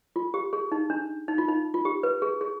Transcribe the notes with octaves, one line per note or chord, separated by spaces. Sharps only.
F4
G4
G#4
D#4
D4
D#4
F4
D#4
F4
G4
B4
G#4
G#4